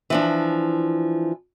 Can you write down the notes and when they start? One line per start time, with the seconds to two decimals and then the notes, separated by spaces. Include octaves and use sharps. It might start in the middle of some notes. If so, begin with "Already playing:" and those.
0.10 E3 F3 D4